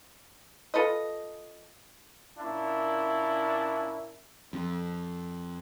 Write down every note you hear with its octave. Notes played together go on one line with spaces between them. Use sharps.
F4 A4 B4 D#5
A#2 A#3 C#4 D4 E4
F2